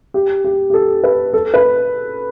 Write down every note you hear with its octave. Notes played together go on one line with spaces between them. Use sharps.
G4
G4
G4
A4
B4
A4
B4